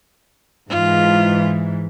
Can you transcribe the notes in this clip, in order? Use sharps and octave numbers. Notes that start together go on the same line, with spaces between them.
G#2 E3 F4